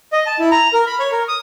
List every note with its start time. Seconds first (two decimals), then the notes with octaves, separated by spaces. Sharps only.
0.13 D#5
0.26 A5
0.39 E4
0.51 A#5
0.73 A#4
0.87 B5
1.00 C#5
1.12 A#4
1.28 D#6